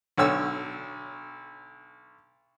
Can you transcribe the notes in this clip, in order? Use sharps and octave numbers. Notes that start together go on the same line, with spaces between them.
B1 D3 C#5 E6